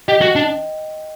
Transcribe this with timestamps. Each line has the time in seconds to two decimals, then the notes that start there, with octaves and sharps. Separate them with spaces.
0.08 G4 D#5 G5
0.21 F#4
0.36 D4